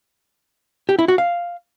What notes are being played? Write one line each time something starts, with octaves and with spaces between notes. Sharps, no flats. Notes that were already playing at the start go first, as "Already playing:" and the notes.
G4
E4
F#4
F5